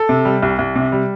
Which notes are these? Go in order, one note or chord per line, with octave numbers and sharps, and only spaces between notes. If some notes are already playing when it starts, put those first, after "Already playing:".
Already playing: A4
C3
G3
C2
C2
C3
G3